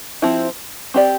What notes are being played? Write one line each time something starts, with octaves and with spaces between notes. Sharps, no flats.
F3 C4 E4 G4
C4 G4 D5